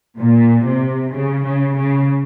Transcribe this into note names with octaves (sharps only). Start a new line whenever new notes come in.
A#2
C3
C#3
C#3
C#3